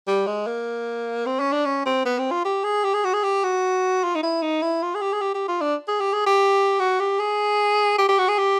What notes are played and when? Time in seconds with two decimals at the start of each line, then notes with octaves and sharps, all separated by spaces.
0.07 G3
0.27 G#3
0.47 A#3
1.26 C4
1.40 C#4
1.52 D4
1.66 C#4
1.86 C4
2.05 B3
2.19 C4
2.31 F4
2.45 G4
2.64 G#4
2.84 G4
2.94 G#4
3.05 F#4
3.14 G#4
3.24 G4
3.44 F#4
4.04 F4
4.15 D#4
4.23 E4
4.42 D#4
4.62 E4
4.82 F4
4.95 G#4
5.02 G4
5.13 G#4
5.22 G4
5.35 G4
5.48 F4
5.61 D4
5.88 G#4
6.00 G4
6.13 G#4
6.27 G4
6.80 F#4
7.00 G4
7.20 G#4
7.98 G4
8.09 G4
8.19 F#4
8.29 G#4
8.39 G4